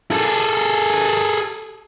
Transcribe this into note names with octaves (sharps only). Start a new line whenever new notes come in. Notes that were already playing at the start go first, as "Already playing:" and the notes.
G#4 A4